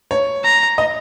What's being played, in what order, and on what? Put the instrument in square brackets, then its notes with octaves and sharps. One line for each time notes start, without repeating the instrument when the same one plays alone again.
[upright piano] C#5
[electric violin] A#5
[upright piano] D#5